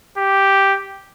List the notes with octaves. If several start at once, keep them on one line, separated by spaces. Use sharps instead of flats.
G4